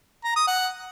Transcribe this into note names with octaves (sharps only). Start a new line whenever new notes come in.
A#5
D#6
F#5